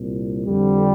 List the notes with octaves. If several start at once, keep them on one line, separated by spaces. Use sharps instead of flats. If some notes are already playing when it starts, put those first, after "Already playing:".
Already playing: C2 A#2
F2 D3 G3